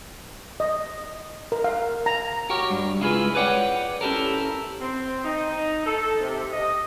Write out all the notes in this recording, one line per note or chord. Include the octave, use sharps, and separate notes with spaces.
D#5
A#4
F5
A#5
F#4 G4 A#4 C#5
G2
C#2 E4 F4 G#4 B4
B4 C#5 D5 F#5 G5
C#4 E4 G4 A4 A#4
C4
D#4
A4
C3
D#5